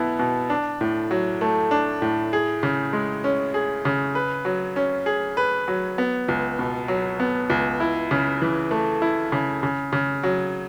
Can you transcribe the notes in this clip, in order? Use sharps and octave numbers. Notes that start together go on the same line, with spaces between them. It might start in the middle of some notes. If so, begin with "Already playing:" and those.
Already playing: B2 B3 E4
B2
D4
A2
F#3
A3
D4
A2
G#4
C#3
G#3
C#4
G#4
C#3
B4
F#3
C#4
G#4
B4
F#3
B3
C#2
B2
F#3
B3
C#2
E4
C#3
E3
A3
E4
C#3
C#3
C#3
F#3